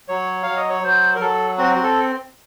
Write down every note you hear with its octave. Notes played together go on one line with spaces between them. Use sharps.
F#3 C#5
F#3 F5
D#5
C#5
F#3 C5
A#4
F#3 A4
C4 F#4
F#4
A4